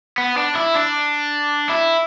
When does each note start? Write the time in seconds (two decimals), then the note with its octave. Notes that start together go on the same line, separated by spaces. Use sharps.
0.18 B3
0.37 D4
0.55 E4
0.75 D4
1.69 E4